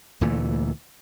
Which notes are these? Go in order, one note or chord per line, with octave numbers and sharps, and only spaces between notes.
D2 A#2 E3 A3